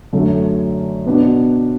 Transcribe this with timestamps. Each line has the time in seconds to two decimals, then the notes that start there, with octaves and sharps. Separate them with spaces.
0.13 F#2 D3 A3 F#4 A4
1.06 B2 B3 D4 F#4